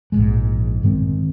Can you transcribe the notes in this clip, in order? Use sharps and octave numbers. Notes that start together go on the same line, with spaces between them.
A#1 G#2 E3 G#3
G2 D#3 G#3 C4